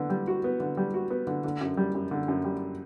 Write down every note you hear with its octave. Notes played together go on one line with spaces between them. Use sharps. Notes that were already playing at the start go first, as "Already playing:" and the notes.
Already playing: D3 B3
G3
F#4
B3
D3
G3
F#4
B3
D3
D3
F#2
G3
F#2
D3
F#2
G3